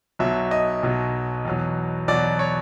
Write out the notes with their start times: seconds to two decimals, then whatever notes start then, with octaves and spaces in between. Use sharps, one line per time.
0.19 B1 B2 F#3 E5
0.51 D#5
0.83 B1 B2 F#3
1.45 E2 B2 F#3
2.08 E2 B2 F#3 D5
2.39 C#5